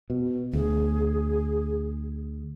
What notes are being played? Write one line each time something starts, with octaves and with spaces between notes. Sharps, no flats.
B2
D2 G#4